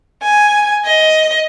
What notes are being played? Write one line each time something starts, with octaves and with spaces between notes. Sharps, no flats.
G#5
D#5